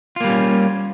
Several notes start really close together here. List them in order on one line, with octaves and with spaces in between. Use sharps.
F4 A#3 G3 C#4